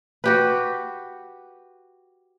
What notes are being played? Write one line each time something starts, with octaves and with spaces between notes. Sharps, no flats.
F#4 G4 B4